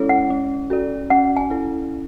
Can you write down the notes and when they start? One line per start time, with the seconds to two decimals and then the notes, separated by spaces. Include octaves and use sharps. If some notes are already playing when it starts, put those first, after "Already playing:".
Already playing: G#3 C#4 E4 A4 C#5
0.09 F#5
0.30 C#4
0.70 F#4 A4 D5
1.10 C#4 F#5
1.36 G#5
1.50 E4 A4